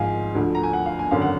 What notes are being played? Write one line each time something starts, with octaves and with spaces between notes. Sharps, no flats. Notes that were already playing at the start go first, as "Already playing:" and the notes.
Already playing: G#1 G#2 F3 D#5 F5 G#5
D2 D3 F3
A#5
G#5
F#5
F5
G#5
G#1 F#2 D3 F5
F#5